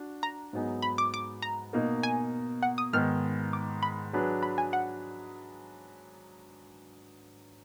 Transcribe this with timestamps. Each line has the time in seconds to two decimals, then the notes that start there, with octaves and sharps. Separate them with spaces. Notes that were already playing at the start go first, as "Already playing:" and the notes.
Already playing: D4 F#4
0.23 A#5
0.53 G#2 F#3 B3 D#4 G#4
0.82 B5
0.98 D6
1.14 D6
1.42 A#5
1.73 B2 A#3 D#4 A#4
2.03 G#5
2.63 F#5
2.78 D#6
2.93 G#2 D#3 G#3 B3 F6
3.53 D6
3.83 B5
4.13 F#3 D4 G#4 B4
4.43 B5
4.58 G#5
4.73 F#5